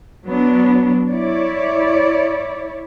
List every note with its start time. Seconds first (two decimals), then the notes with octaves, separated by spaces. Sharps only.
0.26 F#3 B3 D4
1.10 E4 C#5 D5